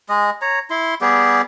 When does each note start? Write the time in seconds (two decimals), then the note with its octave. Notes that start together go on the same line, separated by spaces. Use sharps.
0.09 G#3 D#5
0.42 C#5 A#5
0.70 E4 C6
1.01 G3 B3 G4 G#4